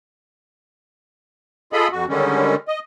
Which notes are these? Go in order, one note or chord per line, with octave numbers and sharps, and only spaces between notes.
F4 G#4 A4 D#5 B5
F2 F#4
D3 D#3 G3 G#3 C#4
D#5